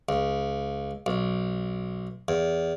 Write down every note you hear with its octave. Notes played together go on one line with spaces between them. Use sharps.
C#2
B1
E2